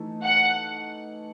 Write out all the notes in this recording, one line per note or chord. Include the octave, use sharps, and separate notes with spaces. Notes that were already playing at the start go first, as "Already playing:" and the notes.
Already playing: E3 A3 D#4
F#5